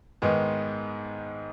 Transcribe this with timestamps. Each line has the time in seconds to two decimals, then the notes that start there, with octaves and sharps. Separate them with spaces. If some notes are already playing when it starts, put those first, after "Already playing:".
0.22 G#2 D#3 G#3 B3